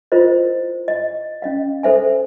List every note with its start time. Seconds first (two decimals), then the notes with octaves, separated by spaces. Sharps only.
0.12 E4 F4 A#4 C5 D#5
0.88 D#5
1.42 C#4 D#5 F5
1.83 A4 C5 E5 G#5